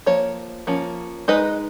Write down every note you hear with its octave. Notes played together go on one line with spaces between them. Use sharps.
F3 A#3 C#5
F3 A#3 C#4
G#3 D#4 B4 D#5